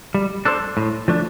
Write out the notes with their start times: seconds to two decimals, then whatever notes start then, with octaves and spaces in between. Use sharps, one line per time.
0.14 G3
0.45 D4 A4 C5
0.77 A2
1.08 F3 A3 D4